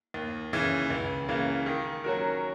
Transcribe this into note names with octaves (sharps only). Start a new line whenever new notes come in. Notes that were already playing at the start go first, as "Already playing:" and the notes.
D#2
C#3 E3
C#2
C#3 E3 A#3
D#3
F#3 C#4 F#4 A#4